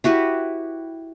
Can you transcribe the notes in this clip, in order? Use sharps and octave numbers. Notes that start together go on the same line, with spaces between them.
E4 F#4 G4 B4